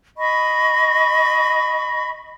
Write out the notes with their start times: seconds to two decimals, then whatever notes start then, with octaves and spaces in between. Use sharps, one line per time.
0.17 D#5 B5 C#6